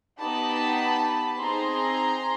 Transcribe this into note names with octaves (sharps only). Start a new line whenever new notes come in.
B3 D#4 G4 A5 B5
C4 D#4 G#4 A#5 C6